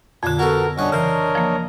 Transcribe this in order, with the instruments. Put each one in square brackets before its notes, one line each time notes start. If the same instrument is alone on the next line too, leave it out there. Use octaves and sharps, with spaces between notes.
[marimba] F2 D3 [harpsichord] A#2 D6
[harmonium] B3 [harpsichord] F#4 A4 [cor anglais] A#4
[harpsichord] G2 F#5 [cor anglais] C#4 [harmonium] D4 C#5 D#5
[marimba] C#3 E3 [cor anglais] A#4 [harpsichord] C5
[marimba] F3 A#3